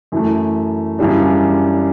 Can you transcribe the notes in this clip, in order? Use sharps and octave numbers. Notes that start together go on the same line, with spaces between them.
F#2 E3 A3
F#2 C#3 E3 G3 D4